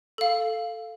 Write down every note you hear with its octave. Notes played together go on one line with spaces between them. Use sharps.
A4 F5